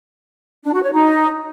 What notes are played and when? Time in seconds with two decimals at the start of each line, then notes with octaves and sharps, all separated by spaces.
0.64 D4
0.73 F#4
0.82 C#5
0.92 D#4